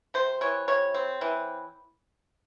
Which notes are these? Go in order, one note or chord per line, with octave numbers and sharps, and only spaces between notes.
C3 C5
E3 C#5
C3 C#5
C4
E3